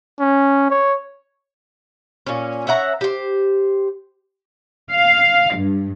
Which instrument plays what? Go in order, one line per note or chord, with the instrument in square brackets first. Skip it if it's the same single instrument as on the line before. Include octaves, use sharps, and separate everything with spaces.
[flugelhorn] C#4
C#5
[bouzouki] A#2 C#4
C#4 E5 F#5 A#5
G4 C5
[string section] F5
G2